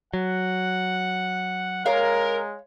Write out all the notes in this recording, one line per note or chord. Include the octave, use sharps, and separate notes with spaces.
F#3 F#5
G#3 A#4 C#5 F5